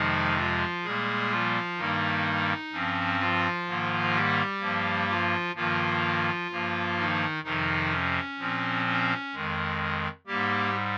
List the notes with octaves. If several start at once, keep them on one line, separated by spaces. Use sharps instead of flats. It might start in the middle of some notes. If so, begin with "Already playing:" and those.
Already playing: F2 C3 D#3 F3 G#3 D#4
F3 F4
A#2 G3 G#3 A#3 G#4
F3 F4
G2 D#3 G3 A#3 D#4
G2 F3 C4 C#4
F3 F4
G#2 D#3 A#3
G3 G4
G2 F3 A#3
F3 F4
G2 D#3 F3 A#3 F4
G2 F3 A#3
D#3 D#4
F2 C3 D#3 F3 D#4
C#4
A#2 F3 C4
C#4
F2 D#3 G#3
G#2 G3 A#3 G4